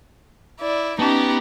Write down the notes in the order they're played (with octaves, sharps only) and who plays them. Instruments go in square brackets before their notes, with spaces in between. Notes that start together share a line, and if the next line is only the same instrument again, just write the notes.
[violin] E4 D5
[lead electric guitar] B3 [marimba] C#4 A5 [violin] D#4 G4